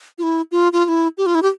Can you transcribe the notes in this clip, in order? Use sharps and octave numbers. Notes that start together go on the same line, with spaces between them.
F4
E4
F4
F4
F4
E4
G4
F4
E4
G4